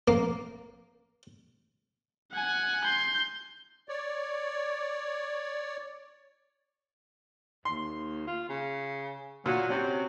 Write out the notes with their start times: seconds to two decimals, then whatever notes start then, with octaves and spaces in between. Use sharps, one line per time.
0.08 A#3
2.32 F#5 G#5
2.85 C6 G6
3.89 C#5 D5
7.65 D#2 C6
8.27 F4
8.49 C#3
9.46 A#2 F#3 F#4
9.70 C3 C#4 F#4